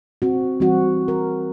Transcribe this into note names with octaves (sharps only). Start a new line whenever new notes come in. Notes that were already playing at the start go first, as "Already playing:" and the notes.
C4 F#4
E3 G3 C4 F#4
A#4